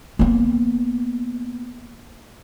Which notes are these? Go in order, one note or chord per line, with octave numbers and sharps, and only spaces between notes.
A#3 B3